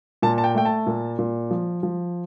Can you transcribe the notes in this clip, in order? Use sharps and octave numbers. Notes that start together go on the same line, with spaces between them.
A#2 A5
A5
G5
A3 G5
A5
A#2
A#2
F3
F3